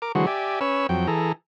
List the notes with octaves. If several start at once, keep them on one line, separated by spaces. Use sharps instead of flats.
A#4 D6
D3 E3 F#3 G#3 F#4 C5
G4 D5 E5 G#5
C#4 B4 C#5 E6
F2 F#3 G5
E3 G#4 A4 A#5